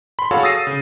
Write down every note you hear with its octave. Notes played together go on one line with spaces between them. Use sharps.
B5 C6
F#4 G#4 A4 C#5 F5
D#6 E6 A6 A#6 C7 D#7
C#3